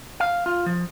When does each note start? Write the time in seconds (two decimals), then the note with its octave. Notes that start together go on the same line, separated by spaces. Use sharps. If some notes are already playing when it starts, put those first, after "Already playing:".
0.20 F5
0.46 F4
0.66 F3